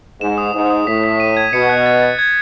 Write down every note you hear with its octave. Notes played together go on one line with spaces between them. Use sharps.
G#2 E7
D#6
G#2 D#6
D#6
A2 B6
B6
D#7
G#6
B2 C#7
F#6
A6
A6
G#6